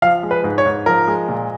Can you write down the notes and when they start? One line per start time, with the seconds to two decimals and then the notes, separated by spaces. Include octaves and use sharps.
0.02 F3 F5
0.23 G#3
0.31 B4
0.44 G#2
0.58 C#5
0.66 G#2
0.86 F3 A#4
1.08 G#3
1.29 A#2